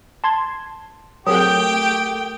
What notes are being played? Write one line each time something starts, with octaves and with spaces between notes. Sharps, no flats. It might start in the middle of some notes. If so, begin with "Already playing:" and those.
A5 C6 G#6
F#3 A3 C4 G4 G#4 A#4 G5 D#6